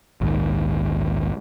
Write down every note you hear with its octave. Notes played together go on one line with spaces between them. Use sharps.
A#1 D#2 G#2 D#3